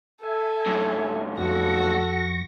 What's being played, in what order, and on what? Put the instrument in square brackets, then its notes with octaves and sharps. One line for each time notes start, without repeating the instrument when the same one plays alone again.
[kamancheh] A4 [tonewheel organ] E5 G#5
[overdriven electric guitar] F#2 A2
[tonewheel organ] F2 C#6 A#6 [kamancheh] F#4 A4